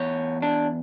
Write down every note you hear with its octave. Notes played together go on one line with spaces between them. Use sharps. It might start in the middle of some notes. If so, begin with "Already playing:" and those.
Already playing: E2 C#5
D4